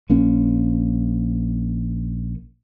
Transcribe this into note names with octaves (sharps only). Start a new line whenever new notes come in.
A#1 A#3 C#4